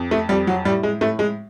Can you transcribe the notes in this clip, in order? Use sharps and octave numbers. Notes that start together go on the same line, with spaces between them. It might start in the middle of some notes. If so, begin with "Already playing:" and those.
Already playing: F2
A3
F2 G3
F#3
A2 G3
G#3
A2 A3
G#3